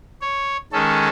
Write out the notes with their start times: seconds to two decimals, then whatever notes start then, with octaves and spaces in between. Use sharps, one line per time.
0.21 C#5
0.72 D#3 G#3 C#4 A4